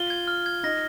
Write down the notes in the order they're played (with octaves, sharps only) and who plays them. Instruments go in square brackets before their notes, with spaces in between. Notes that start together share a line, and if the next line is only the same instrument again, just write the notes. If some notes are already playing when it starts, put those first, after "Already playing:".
Already playing: [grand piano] F4 [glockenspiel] G7
[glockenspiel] G#6
F6
G#6
[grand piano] D#4 [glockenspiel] A#6